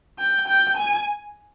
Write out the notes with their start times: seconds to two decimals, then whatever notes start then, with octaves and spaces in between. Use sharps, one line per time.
0.19 G5
0.47 G5
0.77 G#5